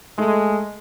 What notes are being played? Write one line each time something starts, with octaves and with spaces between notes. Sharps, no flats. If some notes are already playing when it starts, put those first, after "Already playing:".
G#3 A3